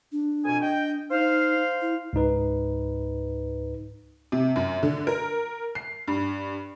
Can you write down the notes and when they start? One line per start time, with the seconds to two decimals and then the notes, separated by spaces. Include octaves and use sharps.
0.12 D4
0.45 F2 B2 G#5
0.61 D#5 G5
1.11 D#4 C5 F5
1.81 E4
2.13 C#2 G#2 D#4 B4
4.32 C3
4.56 F#2
4.83 D3
5.07 A#4
5.75 C7
6.08 G2